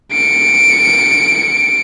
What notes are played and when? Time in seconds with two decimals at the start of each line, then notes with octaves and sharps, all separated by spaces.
0.12 C#7 D7